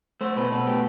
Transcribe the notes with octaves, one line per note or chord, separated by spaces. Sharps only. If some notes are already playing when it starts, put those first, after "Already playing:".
A3 C5
B2 B4
B2 B4
A3 G4